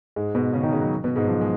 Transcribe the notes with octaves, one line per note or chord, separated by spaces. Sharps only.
G#2 G#3
B2 B3
C#3 C#4
D#3 D#4
C#3 C#4
F#3
B2 B3
G#2 G#3
F#3
F3
G#3